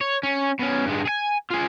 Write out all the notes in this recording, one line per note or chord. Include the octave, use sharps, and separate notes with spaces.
C#5
C#4
B2 C#4
G2 G#3
G#4 G#5
F4 G#4